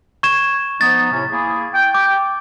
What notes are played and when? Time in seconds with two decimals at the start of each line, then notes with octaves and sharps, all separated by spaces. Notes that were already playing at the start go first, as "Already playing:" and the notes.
0.23 C#6 G#6 E7
0.81 F3 B3 D#4 A6
1.12 A2 C3 C#4
1.30 A#3 E4 G#4
1.74 G5
1.94 D6